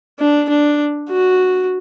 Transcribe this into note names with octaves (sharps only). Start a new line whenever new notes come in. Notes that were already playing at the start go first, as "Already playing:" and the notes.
D4
D4
F#4